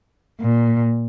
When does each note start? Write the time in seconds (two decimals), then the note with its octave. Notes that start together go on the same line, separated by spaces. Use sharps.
0.40 A#2